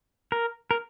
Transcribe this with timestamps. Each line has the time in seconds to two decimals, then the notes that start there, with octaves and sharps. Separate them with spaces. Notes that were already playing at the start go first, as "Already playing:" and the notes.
0.32 A#4
0.71 A#4